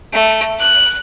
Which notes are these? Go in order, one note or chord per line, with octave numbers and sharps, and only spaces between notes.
A3
F#6